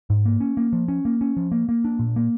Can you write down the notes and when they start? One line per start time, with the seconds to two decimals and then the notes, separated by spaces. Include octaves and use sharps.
0.10 G#2
0.25 A#3
0.40 C#4
0.57 A#3
0.73 F3
0.88 C#4
1.05 A#3
1.21 C#4
1.37 F3
1.52 A#3
1.69 A#3
1.85 D4
1.99 A#2
2.16 A#3